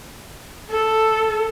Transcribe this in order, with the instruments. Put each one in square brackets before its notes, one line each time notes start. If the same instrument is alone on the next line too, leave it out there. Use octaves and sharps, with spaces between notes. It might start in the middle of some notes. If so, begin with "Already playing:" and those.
[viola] A4